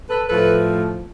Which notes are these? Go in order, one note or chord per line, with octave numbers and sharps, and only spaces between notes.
A4 B4
A2 F3 A3 A4 B4